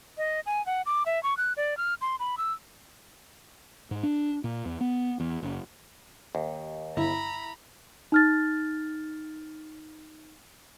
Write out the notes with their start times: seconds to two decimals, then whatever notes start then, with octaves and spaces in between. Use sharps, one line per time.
0.18 D#5
0.46 G#5
0.66 F#5
0.86 D6
1.06 E5
1.23 C#6
1.37 F#6
1.57 D5
1.77 F6
2.01 C6
2.19 B5
2.38 E6
3.91 G#2
4.03 D4
4.44 A#2
4.66 E2
4.81 B3
5.20 E2
5.42 F#1
6.35 D#2
6.97 G1 E4 A#5 B5
8.12 D#4 F6 A6